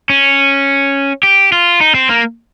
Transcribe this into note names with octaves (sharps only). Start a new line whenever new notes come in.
C#4
G4
F4
D#4
C4
A#3